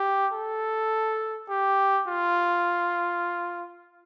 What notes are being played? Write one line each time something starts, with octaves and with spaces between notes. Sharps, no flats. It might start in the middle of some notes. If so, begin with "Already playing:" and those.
Already playing: G4
A4
G4
F4